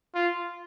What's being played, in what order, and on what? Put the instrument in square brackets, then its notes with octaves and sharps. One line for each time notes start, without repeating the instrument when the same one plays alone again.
[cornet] F4